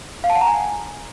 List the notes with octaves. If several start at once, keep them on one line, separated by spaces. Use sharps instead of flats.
F5
A5
F#5
A#5
G#5